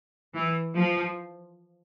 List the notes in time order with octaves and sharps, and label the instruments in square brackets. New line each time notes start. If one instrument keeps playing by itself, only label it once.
[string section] E3
F3